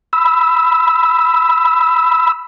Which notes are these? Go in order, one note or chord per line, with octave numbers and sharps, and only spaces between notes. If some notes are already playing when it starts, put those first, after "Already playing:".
B5 E6